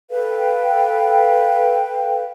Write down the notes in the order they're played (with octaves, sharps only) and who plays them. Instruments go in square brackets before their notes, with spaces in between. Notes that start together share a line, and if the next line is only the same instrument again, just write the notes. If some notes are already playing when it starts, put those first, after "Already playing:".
[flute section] A4 B4 F5 G5